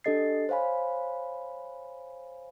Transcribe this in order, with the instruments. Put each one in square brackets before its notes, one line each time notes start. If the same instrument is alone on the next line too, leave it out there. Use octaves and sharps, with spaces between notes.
[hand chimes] D4 G4 A4 D#5 A6 C7
C5 C#5 F5 G#5 B5